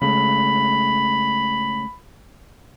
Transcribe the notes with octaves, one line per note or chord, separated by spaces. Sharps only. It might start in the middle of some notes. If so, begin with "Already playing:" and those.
C#3 G#3 A3 B5